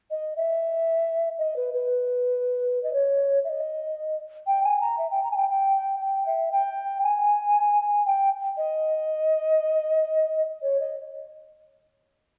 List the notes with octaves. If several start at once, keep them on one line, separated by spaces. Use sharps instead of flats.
D#5
E5
D#5
B4
B4
D#5
C#5
E5
D#5
G5
G#5
A#5
E5
G5
A#5
G#5
G5
G5
G5
E5
G5
G#5
G5
D#5
C#5
D#5